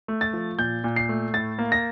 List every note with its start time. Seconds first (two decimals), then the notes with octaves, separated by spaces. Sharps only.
0.08 A3
0.21 A6
0.33 F3
0.58 A#2 G6
0.84 A#2
0.96 C7
1.09 A3
1.34 A2 A6
1.59 A#3
1.72 A#6